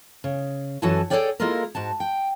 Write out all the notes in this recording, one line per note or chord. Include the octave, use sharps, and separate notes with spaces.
C#3
F#2 E3 F#4 A4 G#5 A5
G#4 A4 B4 C#5 D5 G5
G#3 A#3 E4 F4 A4 A#4
G#2 F#4 A5
G5